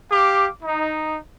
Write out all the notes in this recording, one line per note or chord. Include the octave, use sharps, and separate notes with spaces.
G4 F5 D6
D#4